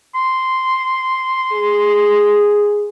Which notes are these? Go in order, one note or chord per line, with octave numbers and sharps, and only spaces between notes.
C6
G#4